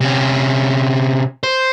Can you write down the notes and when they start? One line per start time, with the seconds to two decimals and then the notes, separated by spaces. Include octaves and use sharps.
0.01 C3 C#4
1.43 C5